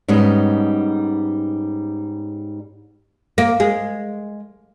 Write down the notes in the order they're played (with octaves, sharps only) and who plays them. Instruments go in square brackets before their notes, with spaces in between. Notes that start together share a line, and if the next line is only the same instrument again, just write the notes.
[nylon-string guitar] G#2 G3 B3 C#4 D#4
[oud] A#3
G#3